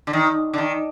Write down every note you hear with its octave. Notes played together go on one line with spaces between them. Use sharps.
D3
D#3
D3
D#3